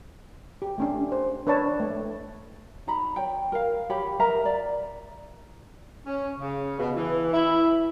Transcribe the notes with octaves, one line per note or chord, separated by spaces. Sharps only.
G4
A3 C#4 D4
C5
D4 B4 C#5 D5 A5
A3
D#4 A#5 B5
C#5 G5
A#4 F5
G4 C#5 G5 B5
A#4 E5 F5 A#5
D5
C#4
C#3
B2
E3
E4